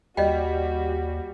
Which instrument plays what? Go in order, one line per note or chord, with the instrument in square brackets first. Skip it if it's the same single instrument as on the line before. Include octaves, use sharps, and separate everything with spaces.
[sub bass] D#2 [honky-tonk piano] G3 [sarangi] F#4 [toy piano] D#5 G5